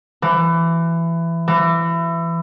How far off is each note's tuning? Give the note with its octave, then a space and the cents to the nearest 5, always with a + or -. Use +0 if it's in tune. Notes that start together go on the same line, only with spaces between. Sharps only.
E3 +20
E3 +25